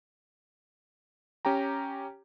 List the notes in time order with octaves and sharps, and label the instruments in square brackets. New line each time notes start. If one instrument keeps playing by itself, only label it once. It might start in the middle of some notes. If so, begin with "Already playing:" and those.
[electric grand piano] C#4 G4 G5 A#5